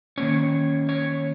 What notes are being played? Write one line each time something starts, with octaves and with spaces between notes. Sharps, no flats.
D#3 A#3 C#4 C#5
C#5